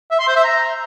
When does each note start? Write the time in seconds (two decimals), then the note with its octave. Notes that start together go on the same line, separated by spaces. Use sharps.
0.11 E5
0.19 C6
0.28 C5
0.36 E5
0.44 A#5